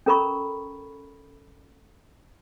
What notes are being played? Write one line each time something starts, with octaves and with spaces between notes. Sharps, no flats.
C#4 A4 A#4 A#5 B5 C#6